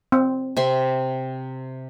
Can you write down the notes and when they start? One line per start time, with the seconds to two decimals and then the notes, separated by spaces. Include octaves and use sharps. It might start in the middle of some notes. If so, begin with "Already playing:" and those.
0.12 C4
0.57 C3 E5 C6